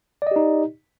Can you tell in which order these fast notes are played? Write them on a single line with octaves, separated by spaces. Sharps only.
D5 D#5 G4 D#4